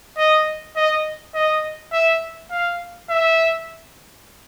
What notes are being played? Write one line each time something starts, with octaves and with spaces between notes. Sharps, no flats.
D#5
D#5
D#5
E5
F5
E5